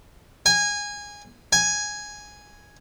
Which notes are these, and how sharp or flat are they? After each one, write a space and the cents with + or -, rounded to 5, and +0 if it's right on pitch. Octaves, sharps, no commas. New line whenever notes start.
G#5 -15
G#5 +0